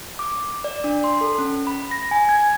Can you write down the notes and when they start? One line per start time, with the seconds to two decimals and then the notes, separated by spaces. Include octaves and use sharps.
0.19 D6
0.64 D5
0.84 D4
1.04 C6
1.21 A4
1.38 C#4
1.67 B5
1.91 A#6
2.11 G#5
2.29 G#6